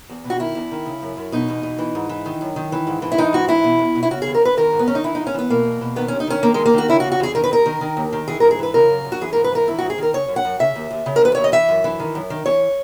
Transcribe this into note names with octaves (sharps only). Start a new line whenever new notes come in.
E2
B2
F#4
D#3 E4
E2
D#3
C#3
F#2
F#2
B2 D#4
E2
B2
E3
G#2
E3
D#3
F#2
D#3
E3
G#2
E3
E4
E3 D#4
G#2 F#4
E3 E4
B2
E2
B2
E4
C#3 F#4
E2 G#4
A#4
E2 B4
D#3 A#4
G#2
B3
D#3 C#4
D#4
E3 E4
G#2 D#4
C#4
E3 B3
B2 A#3
E2
B2
D#3 B3
D#2 C#4
D#4
D#3 C#4
D#3 A#3
D#2 G#3
A#3
D#3 F#4
C#3 E4
F#4
E2
F#4
E2 G#4
D#3 A#4
B4
D#2 A#4
D#3
D#3
D#2
D#3
E3 G#4
G#2 A#4
G#4
E3 B4
C#3 A#4
F#2
F#2
F#4
E3 G#4
G#2 A#4
B4
E3 A#4
D#3 E4
G#2 F#4
G#4
D#3 A#4
C#3 C#5
F#2
F#5
F#2
C#3 E5
D#2
D#2
C#3
A#4
D#2 B4
D#2 C#5
D#5
E3 E5
F#2
E3
D#3
F#2
D#3
E3 C#5